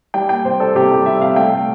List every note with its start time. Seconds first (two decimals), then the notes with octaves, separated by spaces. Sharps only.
0.14 G3 G5
0.29 A#3 G5
0.45 C3 C5
0.60 G3 A4
0.75 C3 G4
0.91 G3 A4
1.06 G3 E5
1.21 C3 F5
1.36 A3 G5
1.52 A3